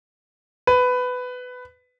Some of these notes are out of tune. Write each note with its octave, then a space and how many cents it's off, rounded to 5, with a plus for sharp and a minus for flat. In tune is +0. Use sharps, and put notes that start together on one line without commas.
B4 +15